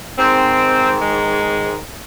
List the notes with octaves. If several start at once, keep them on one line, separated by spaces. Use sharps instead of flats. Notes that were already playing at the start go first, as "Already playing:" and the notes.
G#2 D#3 C4
G#3